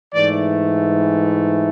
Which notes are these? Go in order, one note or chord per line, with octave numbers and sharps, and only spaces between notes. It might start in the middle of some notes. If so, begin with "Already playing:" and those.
G#2 E3 A3 D5